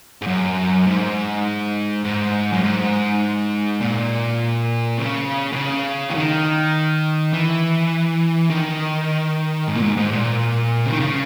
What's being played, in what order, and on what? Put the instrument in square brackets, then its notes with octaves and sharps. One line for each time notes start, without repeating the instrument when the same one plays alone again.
[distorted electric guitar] G#2
F#2
G#2
G#2
F#2
G#2
A#2
C#3
B2
C#3
E3
D#3
E3
D#3
G#2
A#2
G#2
G#2
A#2
C#3
D#3
C#3